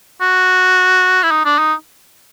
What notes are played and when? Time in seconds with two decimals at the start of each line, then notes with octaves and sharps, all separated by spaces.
0.21 F#4
1.23 E4
1.31 D#4
1.45 D4
1.59 D#4